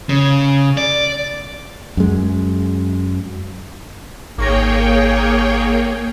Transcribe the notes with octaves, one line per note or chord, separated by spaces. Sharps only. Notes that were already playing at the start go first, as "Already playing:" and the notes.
C#3
D5
F#2 G#3
G#1 A#3 G#4 C#5 G5 C#6 A#6